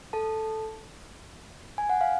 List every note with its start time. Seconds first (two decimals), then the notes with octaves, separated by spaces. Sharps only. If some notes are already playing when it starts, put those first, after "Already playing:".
0.13 A4 A5
1.78 G#5
1.89 F#5
2.01 F5